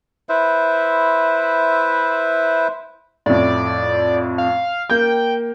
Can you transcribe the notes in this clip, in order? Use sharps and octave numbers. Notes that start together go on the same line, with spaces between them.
E4 B4 C5 E5
F2 A2 D5
F5
A#3 G5 G6